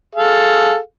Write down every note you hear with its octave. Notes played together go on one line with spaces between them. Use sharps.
G#4 A4 F5